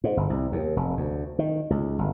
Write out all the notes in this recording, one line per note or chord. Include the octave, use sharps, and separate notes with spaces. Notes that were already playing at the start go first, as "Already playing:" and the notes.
G#2
G1
C2
D#2
F1
D2
D#3
C#2
G1